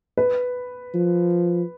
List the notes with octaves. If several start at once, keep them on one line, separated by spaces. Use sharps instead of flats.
B4
F3